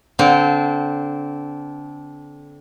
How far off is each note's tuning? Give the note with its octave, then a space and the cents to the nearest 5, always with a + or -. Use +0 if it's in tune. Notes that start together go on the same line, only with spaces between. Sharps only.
D3 -25 C4 -20